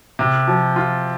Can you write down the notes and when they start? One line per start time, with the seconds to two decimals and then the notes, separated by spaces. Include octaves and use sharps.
0.19 C3
0.47 F3
0.76 F4